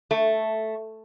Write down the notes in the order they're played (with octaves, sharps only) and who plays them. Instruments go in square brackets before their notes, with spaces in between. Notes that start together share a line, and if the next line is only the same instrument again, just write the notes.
[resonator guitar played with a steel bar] A3